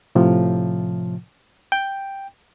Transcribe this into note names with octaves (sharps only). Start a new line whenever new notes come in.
A2 C3 F3
G5